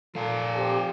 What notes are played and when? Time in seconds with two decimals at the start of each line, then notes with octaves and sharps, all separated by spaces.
0.15 A#2 F3 A4 F5 G#5
0.56 C4 G4